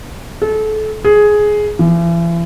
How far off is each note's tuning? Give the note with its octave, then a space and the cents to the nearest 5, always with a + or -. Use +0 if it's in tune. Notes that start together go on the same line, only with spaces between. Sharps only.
A4 -30
G#4 +10
E3 +40